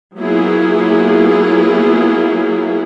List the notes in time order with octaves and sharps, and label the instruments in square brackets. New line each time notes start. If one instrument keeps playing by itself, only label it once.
[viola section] F#3 A#3 B3 E4 F4 G#4